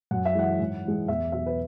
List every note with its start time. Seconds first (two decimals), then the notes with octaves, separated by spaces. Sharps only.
0.11 F#2 F#5
0.25 E5
0.35 E3 G#3 F#5
0.59 G#2
0.85 E3 G#3
1.08 E2 E5
1.32 B2 F#3 E5
1.46 B4